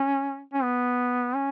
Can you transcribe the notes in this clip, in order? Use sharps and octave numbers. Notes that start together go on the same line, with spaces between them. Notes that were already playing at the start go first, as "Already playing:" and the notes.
Already playing: C#4
C#4
B3
C#4